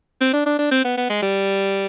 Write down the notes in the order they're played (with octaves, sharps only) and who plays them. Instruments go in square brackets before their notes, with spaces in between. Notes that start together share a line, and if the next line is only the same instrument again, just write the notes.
[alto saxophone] C4
D4
D4
D4
C4
B3
B3
G#3
G3